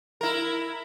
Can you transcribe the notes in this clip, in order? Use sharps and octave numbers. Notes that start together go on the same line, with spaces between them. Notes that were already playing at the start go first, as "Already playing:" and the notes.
E4 A#4